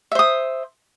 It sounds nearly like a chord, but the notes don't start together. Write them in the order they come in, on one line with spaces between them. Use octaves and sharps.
E5 C5 D#6